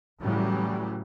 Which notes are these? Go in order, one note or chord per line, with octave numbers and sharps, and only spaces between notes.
A2 C#3 E3 F#3 G3